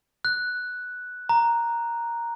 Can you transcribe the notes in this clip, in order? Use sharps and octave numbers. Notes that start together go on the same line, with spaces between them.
F#6
A#5